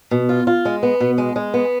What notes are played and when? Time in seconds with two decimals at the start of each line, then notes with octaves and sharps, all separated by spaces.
0.11 B2
0.29 F4
0.47 F4
0.65 G#3
0.83 B3
1.00 B2
1.18 G#3
1.36 G#3
1.54 B3